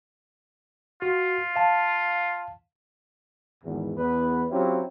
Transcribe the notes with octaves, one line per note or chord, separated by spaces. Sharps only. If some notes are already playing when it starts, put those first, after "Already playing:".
F4 F#4
F5 A5
G#1 E2
E2 B3 B4
F#3 C4 C#4 E4 F4 G4